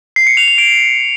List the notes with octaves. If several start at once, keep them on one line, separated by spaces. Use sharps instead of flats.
C7
C#7
F7
F7
D7